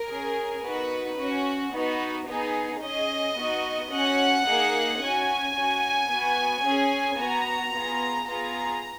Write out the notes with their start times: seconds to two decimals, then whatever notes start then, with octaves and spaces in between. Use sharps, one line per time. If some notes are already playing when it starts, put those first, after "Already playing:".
Already playing: A#4
0.10 C#4 G#4
0.64 B3 D#4 F#4 B4
1.19 C#4 F#4
1.73 B3 D#4 F#4
2.28 B3 D#4 G#4
2.82 C#4 G#4 D#5
3.37 B3 D#4 F#4
3.91 C#4 F#4 F#5
4.46 A#3 D#4 G#4
5.01 C#4 F#4 G#5
5.56 C#4 F#4
6.09 B3 F#4
6.65 C#4 G#4
7.19 B3 F#4 A#5
7.74 B3 F4 G#4
8.28 B3 F4 G#4 A#5